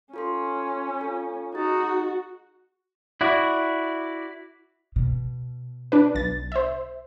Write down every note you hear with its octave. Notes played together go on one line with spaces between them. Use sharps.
C#4 F4 A4 C6
F4 A4
D#4 F#4 G#4 A6
E4 F#4 D5
B2
D4 B4
B1 A6
C5 E5